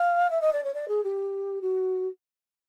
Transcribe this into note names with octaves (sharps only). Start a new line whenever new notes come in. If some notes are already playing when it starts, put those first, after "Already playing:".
Already playing: F5
E5
D#5
D5
C#5
D5
G#4
G4
F#4